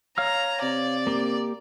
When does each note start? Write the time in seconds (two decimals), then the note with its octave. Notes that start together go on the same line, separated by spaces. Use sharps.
0.18 C#5 F5 A#5 F6
0.62 C3 D5
1.07 A#3 G4